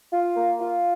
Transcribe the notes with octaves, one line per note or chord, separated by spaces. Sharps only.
F4
A#3
F4